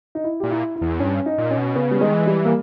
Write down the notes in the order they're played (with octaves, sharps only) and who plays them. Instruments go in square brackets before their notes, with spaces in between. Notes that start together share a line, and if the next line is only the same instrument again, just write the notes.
[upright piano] D#4
E4
[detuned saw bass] A#2 [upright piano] G4
[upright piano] E4
E4
[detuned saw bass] E2
[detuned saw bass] G2 [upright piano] C#4
[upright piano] D#4
[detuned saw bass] A#2
[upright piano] C#4
[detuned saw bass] B2
[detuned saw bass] C#3 [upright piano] B3
[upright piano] G3
[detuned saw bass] D#3 [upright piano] G#3
[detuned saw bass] E3
[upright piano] G3
A#3